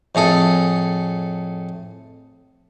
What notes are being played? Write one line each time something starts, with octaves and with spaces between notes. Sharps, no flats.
F2 A2 G#4 A4